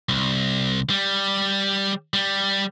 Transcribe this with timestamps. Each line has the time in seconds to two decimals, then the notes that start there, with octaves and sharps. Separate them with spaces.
0.09 C2
0.90 G3
2.13 G3